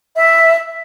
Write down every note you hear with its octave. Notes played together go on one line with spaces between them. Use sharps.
E5